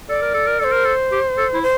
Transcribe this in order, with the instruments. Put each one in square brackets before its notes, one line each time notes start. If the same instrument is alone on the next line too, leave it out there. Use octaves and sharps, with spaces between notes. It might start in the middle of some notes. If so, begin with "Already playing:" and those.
[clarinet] A4 [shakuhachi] D5
[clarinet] A#4
A4
A#4
[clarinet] A4 [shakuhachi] D5
[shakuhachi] C5
[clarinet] A#4
A4
G4
A4
E4
[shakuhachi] C5